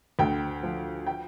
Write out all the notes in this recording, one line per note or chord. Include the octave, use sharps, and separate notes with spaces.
D2 G5
F3
G5